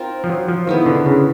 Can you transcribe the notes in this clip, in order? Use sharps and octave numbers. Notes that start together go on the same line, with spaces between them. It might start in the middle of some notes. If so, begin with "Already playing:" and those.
Already playing: C4 D#4 F4 A#4
F3
F#3
F3
D#3 B3 E4 G#4
D3
C#3